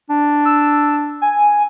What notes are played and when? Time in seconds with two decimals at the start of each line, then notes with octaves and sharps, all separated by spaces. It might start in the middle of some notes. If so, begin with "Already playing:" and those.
0.10 D4
0.45 E6
1.22 G#5